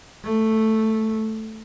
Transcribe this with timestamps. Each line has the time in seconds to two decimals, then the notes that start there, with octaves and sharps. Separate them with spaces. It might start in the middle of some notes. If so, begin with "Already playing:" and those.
0.24 A3